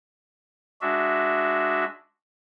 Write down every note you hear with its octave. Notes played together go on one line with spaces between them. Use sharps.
G#3 D4 F#4 E5